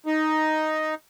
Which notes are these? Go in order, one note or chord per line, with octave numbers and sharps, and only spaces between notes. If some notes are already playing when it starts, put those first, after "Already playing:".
D#4